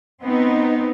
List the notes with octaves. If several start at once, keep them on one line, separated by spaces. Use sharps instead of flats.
B3 C4 D#4